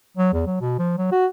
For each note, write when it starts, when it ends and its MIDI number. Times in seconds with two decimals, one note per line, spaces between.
0.17 0.33 54
0.33 0.46 40
0.46 0.60 54
0.61 0.76 47
0.79 0.98 53
0.98 1.10 54
1.12 1.27 66